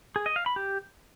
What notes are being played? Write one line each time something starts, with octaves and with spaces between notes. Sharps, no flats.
G#4
D#5
F5
B5
G4